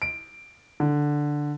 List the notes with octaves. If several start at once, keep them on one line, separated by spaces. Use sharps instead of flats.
D7
D3